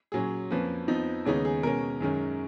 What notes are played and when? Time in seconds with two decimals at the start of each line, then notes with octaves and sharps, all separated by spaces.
0.12 A#2 F#3 C#4 G#4
0.50 F2 F3 A#3 C#4 B4
0.88 F2 F3 B3 D#4
1.26 D#2 C#3 G#3 B3 D#4 C#5
1.45 G#4
1.63 B2 G#3 C#4 A#4
2.00 F#2 D#3 G#3 C#4